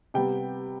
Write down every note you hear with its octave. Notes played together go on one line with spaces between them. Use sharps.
C3 G3 B3 G5